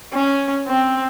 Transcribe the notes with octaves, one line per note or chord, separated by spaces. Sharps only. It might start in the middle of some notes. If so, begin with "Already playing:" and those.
C#4
C4